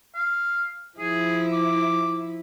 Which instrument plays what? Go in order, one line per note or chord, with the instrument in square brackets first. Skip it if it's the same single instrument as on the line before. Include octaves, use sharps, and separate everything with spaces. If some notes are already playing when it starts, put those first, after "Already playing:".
[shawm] F5
[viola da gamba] F3 E4 [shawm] G#4
[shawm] D6